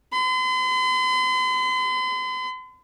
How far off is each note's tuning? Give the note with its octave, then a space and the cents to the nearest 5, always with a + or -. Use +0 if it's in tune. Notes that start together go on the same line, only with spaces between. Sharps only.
C6 -45